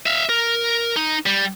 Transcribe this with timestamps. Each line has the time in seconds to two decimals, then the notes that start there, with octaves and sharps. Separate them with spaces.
0.06 E5 F5
0.29 A#4
0.96 D#4
1.26 G3